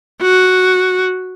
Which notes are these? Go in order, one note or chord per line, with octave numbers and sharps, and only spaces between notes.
F#4